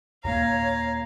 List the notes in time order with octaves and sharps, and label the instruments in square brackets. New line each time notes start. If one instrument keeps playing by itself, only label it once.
[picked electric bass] D#2 A#2 A#3 [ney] C#5 [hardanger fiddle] F5 [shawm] A#5